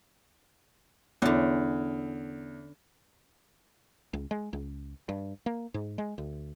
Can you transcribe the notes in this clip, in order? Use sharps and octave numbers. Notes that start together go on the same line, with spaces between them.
E2 D3 C#4
C#2
G#3
C#2
G2
A#3
G#2
G#3
D2